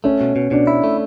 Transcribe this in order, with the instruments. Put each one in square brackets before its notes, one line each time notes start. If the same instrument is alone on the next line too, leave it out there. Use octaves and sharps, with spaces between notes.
[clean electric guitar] A3 [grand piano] C#4
[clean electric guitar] B2
B2
[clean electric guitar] B2 [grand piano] D4
[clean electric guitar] E4
A3